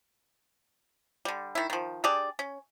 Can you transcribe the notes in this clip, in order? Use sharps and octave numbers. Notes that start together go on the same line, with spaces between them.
D3 G3
D#3 E4
D#3 F3
D4 G4 G#4 D5
C#4